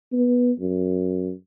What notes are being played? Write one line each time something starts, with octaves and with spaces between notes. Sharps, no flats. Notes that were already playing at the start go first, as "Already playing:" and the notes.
B3
F#2